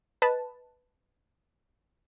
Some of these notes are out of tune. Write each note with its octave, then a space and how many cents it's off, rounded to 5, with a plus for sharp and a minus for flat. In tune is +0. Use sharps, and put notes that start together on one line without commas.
B4 +0 D#5 +0 A5 +0